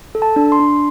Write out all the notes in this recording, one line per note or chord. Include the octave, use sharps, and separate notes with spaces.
A4
A5
D4
C6
D4